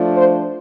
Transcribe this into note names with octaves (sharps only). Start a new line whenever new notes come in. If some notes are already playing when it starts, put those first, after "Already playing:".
Already playing: F3 A3 D4
C5